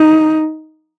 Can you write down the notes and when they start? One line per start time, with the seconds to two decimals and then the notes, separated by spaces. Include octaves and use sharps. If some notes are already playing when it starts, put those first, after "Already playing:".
Already playing: D#4